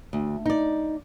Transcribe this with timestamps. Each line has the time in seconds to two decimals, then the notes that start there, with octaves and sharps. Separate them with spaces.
0.13 D2
0.46 D#4 D5